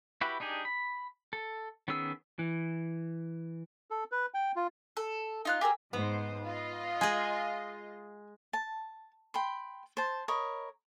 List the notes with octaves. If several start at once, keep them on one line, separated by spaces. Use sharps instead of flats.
E4 F#4 G4 B4
D4 D#4 G4 G#4
B5
A4
D#3 B3 C#4 G#4 E6
E3
A4
B4
G5
F4
A4
D#4 F4 F#6
G4 G#4 A#4 E6
G#2 B3 C5
F4 D#5
G#3 G#4 G#5
A5
G5 B5 C6
C5 A5
A#4 C#5 D#5 B5